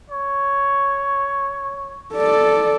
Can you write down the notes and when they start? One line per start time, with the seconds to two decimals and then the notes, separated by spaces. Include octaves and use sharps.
0.10 C#5
2.14 A4 D5